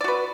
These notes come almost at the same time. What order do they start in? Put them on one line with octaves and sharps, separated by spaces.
D5 F#4 B4